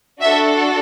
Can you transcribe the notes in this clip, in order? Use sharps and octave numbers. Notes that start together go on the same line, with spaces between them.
D4 F#4 A4 E5